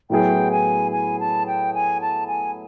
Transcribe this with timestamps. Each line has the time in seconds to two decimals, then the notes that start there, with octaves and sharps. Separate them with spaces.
0.10 A2 F#3 B3 E4 G#4 G5
0.52 G#5
0.92 G#5
1.20 A5
1.47 G5
1.74 G#5
2.01 A5
2.27 G#5